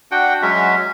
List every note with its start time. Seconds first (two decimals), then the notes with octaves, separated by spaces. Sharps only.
0.11 D4 F#4 F#5 G5
0.42 F#3 G#3 C#4 E5